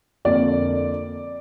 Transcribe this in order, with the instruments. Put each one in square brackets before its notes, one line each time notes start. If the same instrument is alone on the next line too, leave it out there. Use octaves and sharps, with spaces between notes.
[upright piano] F2 D3 A#3 D5